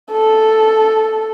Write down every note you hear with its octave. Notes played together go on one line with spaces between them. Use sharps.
A4